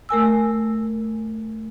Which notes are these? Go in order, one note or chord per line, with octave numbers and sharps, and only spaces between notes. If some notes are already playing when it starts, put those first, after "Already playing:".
A3 A#4 G#5 E6